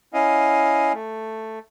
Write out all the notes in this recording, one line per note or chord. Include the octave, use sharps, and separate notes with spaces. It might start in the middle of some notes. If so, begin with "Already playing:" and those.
C#4 E4 D#5 F5
A3